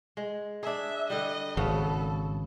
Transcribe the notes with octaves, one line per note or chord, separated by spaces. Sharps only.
G#3
D4 G#4 E5
D3 G3 D#5
G#1 C#3 B3 F#4 A4